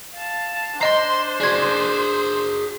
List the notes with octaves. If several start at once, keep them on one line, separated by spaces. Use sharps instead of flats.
F5 A5
D4 C5 D#5 A#5 C6 C7
F#4 G#4 D5 G#6